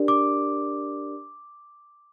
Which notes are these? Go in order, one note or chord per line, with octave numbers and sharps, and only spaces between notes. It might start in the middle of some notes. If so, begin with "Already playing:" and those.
Already playing: D4 G4 A#4 D5
D6